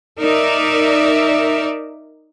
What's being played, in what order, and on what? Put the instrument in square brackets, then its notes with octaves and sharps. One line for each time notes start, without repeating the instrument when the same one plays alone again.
[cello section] D#4 A#4 D5 E5